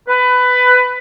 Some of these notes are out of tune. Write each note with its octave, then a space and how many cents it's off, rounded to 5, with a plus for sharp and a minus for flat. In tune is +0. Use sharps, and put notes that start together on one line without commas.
B4 +15